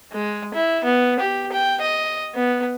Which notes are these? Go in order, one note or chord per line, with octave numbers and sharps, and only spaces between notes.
G#3
E4
B3
G4
G5
D#5
B3